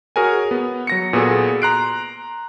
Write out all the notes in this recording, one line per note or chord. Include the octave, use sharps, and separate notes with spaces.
F#4 G#4 A#4 C#5 G#5
B3
F#3 A#6 C#7
A#2 B3 F#4 G#4 A4
A#5 C6 F#6 C7 D7